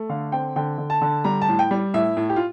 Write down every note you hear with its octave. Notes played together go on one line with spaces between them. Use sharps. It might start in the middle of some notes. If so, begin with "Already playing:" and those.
Already playing: A3
D3 F5
C4 G5
D3 G5
D3
A5
D3
G3 A#5
A5
A2
G5
G3
A2 E5
A2
G4
F4